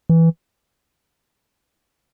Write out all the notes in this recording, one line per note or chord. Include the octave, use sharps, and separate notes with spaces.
E3